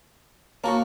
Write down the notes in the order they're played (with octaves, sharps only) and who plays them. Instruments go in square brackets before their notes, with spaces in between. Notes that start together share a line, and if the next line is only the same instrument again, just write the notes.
[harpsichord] A#3 F#4 [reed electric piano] C#5 F5 A5 [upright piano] A#5 C#6